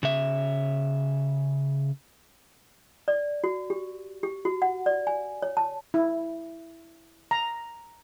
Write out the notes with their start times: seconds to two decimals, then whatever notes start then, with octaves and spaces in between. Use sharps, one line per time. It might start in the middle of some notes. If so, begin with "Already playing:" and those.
0.03 C#3 E5
3.08 D5
3.44 F#4
3.70 G4
4.23 G4
4.45 F#4
4.62 F#5
4.86 D5
5.07 G#5
5.42 C#5
5.57 A5
5.94 E4
7.31 A#5